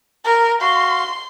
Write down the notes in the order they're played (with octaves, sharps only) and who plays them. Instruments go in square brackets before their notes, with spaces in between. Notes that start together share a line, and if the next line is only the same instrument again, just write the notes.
[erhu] A#4
[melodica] F#4 F5 [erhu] C6